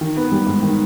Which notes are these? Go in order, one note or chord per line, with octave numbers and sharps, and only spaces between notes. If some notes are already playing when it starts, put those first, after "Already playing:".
D#3
B3
G3
G#2
D#3